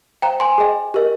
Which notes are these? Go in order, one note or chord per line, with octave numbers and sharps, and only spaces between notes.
C5 F5 G5 A#5
G#5 C6
G#4 D#5 G5
G4 A#4 D#5